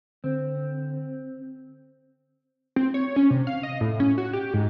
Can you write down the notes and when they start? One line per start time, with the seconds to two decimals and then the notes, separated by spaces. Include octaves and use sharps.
0.24 D3 C4
2.76 C4
2.94 C#5
3.16 C#4
3.30 C3
3.47 F5
3.63 D#5
3.81 A2
4.00 C#4
4.18 F#4
4.33 G4
4.54 G#2